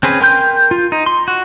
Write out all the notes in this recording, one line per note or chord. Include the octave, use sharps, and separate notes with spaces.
C4 C#4 G#4 B4
A#4 G5 C6 G6
F4
D#4
C6
F#4